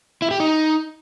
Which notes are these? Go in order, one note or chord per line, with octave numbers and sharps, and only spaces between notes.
E4
G4
D#4